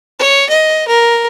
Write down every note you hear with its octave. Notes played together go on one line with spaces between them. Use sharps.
C#5
D#5
A#4